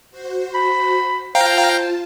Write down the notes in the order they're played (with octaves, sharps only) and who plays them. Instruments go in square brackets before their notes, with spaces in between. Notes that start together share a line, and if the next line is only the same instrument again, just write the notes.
[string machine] F#4 C5
[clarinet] B5
[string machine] F4 A5 [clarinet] C5 [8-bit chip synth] F5 G5 A#5